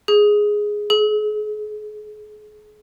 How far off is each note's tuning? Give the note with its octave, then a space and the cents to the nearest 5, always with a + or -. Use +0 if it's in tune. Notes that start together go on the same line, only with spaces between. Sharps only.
G#4 +0
G#4 +35